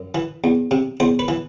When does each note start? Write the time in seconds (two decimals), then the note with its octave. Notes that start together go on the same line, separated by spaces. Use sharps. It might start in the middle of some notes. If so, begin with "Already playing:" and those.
Already playing: F#2
0.15 E3
0.44 E2
0.71 C3
1.00 E2 C5
1.19 B4
1.28 E3